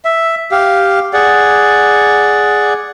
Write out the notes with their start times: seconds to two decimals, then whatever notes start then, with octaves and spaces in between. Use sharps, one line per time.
0.05 E5
0.52 G4 F5
1.13 G#4 D5 F#5